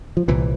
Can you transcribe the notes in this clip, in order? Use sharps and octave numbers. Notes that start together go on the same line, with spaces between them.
F3
C2 A#2 E3